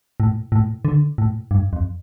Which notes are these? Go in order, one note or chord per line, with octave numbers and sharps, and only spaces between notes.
A2
A2
D3
A2
G2
F2